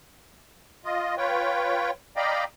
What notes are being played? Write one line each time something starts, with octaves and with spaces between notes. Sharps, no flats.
F4 D#5
F4 B4 C#5 G5
D5 D#5 F5 G5 A#5 B5